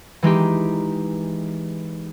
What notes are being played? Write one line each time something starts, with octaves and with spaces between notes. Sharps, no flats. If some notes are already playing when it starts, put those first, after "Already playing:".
E3 G#3 D#4 G4